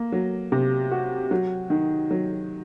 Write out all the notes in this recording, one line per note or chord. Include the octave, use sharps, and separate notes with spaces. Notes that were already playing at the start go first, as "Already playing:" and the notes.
Already playing: A#3
F#3
C3
F#4
F#3
D#3
F#3